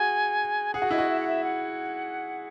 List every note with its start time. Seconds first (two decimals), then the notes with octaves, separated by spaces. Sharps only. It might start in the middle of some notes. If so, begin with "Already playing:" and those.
Already playing: F#4 G#4 G#5
0.74 G#4 F#5
0.82 F#4
0.91 E4 D#5
0.98 F#4
1.10 E5
1.20 F#5
1.28 E5
1.44 F#5